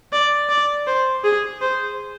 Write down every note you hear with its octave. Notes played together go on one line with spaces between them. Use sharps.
D5
D5
C5
G#4
C5